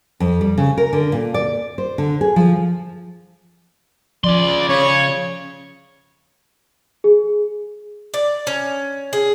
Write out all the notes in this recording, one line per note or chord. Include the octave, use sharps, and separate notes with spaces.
F2
G3
C#3
A#4
D3
A#2
D5
C5
D3
G#4
F3
C#3 F3 D5 C6
C#3 C#5
G#4
D5
C#4
G#4